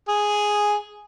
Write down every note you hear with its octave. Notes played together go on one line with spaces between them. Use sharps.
G#4